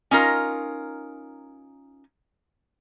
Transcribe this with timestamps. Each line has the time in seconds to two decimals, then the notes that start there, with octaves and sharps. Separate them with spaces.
0.11 C#4 D#4 F4 A#4